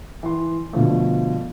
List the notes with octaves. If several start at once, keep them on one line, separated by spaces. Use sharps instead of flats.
E3 C6
B2 D3 F3 A3